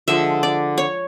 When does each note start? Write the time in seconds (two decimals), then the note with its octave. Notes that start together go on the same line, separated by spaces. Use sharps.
0.08 D3 F3 G#3 E5
0.43 D5
0.78 C#5